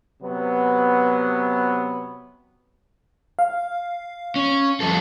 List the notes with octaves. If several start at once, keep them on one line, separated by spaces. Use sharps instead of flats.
C3 F#3 B3
F5
C#4
F3 G3 A4